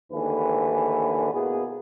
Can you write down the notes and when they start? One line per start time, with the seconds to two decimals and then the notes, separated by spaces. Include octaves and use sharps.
0.12 D#2 G#2 D3 E3 A3 B4
1.34 B2 A#3 B3 E4 G#4